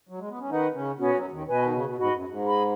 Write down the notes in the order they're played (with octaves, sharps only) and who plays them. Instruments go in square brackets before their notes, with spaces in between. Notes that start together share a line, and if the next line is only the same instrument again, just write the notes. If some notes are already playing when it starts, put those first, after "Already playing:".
[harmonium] F#3
G#3
B3
C#4
[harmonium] D#3 D#4 [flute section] B4 D#5 F#5
[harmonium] C#3 C#4
[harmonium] B2 B3 [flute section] C#4 F#4 C#5
[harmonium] F#2 F#3
D#2 D#3
[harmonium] B2 [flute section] B4 D#5 G#5
[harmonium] D#3
C#3
B2
[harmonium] G#2 [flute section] F#4 D#5 B5
[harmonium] F#2
G#2
[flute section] G#4 D#5 B5